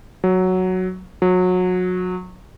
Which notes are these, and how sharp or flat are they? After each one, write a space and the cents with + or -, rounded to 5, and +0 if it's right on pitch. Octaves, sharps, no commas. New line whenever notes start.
F#3 +0
F#3 -25